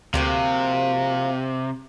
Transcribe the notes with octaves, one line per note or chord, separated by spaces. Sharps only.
D2 C3 F3 A#3 F#4